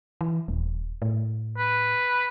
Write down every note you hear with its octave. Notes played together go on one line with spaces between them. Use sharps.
E3
D#1
A2
B4